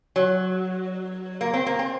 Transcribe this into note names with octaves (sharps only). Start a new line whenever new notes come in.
F#3
A#3
C4
A#3
C4